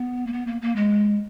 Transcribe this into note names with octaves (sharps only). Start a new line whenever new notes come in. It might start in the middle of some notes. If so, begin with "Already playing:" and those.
Already playing: B3
A#3
B3
A#3
A#3
G#3